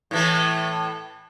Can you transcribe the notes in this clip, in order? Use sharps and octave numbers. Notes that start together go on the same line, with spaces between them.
A2 E3 A3